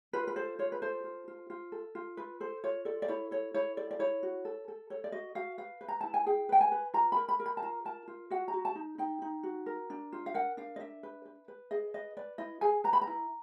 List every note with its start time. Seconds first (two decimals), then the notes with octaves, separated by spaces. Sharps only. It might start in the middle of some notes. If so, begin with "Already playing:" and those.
0.13 F4 B4
0.27 B4
0.36 A4 C5
0.59 F4 C#5
0.72 B4
0.82 A4 C5
1.04 F4
1.28 F4
1.50 F4
1.72 A4
1.95 F4
2.17 F4 B4
2.40 A4 C5
2.64 F4 C#5
2.85 A4 D5
3.02 D5
3.08 E4 C#5
3.31 A4 C#5
3.54 E4 C#5
3.77 A4 D5
3.91 D5
3.99 E4 C#5
4.23 F#4
4.45 A4
4.68 A4
4.90 A4 C#5
5.04 D5
5.12 F#4 D#5
5.35 F#4 F5
5.58 B4 F5
5.81 B4
5.88 A#5
6.01 E4 A5
6.14 G#5
6.26 G#4 G5
6.49 B4 G5
6.61 G#5
6.72 B4
6.94 F4 A#5
7.12 A#4 B5
7.29 B5
7.40 A#4
7.46 B5
7.57 A5
7.62 F4 A#5
7.85 A#4 A5
8.08 F4
8.30 F#4 F#5
8.48 A#5
8.54 F#4
8.65 A5
8.75 D#4
8.98 D#4 G5
9.22 D#4
9.43 F#4
9.66 A#4
9.90 D4
10.13 F4
10.26 F5
10.34 A#4 F#5
10.57 D4 F5
10.76 D#5
10.80 D4 E5
11.03 B4
11.25 B4
11.48 B4
11.71 G#4 D#5
11.94 B4 D#5
12.17 B4 D5
12.38 E4 D#5
12.61 G#4 G#5
12.84 B4 A#5
12.93 B5
13.01 A#5
13.07 E4